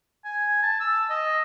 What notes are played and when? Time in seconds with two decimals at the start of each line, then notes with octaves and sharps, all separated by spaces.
0.25 G#5
0.63 A5
0.81 E6
1.10 D#5